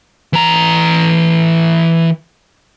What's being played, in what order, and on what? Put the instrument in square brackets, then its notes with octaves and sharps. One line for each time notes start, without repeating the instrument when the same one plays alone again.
[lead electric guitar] E3 A#5